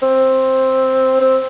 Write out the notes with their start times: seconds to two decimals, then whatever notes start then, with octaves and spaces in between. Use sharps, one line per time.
0.03 C4
1.21 C4